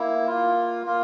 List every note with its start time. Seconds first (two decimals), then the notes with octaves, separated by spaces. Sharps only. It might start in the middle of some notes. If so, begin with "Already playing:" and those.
Already playing: A#3 E4
0.27 A#3 F4
0.86 A#3 F4